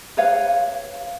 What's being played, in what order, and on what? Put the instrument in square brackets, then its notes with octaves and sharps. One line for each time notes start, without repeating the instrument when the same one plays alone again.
[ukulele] B4 C#5 F5